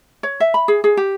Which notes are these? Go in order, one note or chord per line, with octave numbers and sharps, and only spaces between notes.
C#5
E5
B5
G#4
G#4
G4